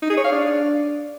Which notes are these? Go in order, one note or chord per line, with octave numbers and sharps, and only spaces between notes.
D#4
G#4
C#5
F5
D4